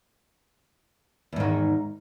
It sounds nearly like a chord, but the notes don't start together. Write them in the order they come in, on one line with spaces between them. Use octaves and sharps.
E2 G#2 D#3